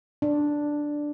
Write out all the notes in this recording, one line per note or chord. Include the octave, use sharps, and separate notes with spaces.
D4